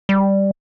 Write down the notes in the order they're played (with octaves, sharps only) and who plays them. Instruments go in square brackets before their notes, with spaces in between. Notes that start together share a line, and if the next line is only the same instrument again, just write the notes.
[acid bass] G3